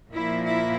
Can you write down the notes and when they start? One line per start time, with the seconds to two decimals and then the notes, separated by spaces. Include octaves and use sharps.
0.12 A#2 F3 A#3 E4
0.45 E4